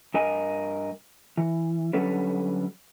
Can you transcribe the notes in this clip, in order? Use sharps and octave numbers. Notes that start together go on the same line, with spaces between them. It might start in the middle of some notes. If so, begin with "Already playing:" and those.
G2 A#4 D#5 G#5
E3
D3 F#3 G3 C#4 A4 B4